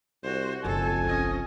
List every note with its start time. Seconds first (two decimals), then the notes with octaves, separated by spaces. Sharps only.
0.23 C2 F#4 C5
0.64 F#1 B1 F2 A4 G#5
1.05 C#4 D#5